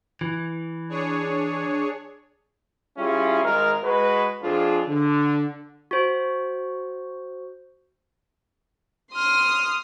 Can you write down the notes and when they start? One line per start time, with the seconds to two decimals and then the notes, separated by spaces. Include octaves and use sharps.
0.21 E3
0.89 D4 G#4 C#5
2.97 G3 C#4 E4 F4 G#4
3.43 G#1 G#3 A#4
3.84 G#3 F#4 B4
4.43 F2 D4 F4 G#4
4.87 D3
5.91 F#4 C5
9.12 C6 D#6 F6